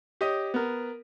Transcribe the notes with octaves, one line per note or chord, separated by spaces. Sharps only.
G4 C#5 D#5 D#6
B3 A#4